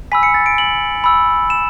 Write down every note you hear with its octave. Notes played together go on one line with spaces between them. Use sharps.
G#5 B5 E6 B6
C#7
A6
D7
F#7
B5 E6
E7